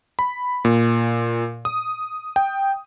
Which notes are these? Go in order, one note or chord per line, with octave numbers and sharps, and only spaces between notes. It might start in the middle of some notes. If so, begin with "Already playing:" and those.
B5
A#2
D#6
G5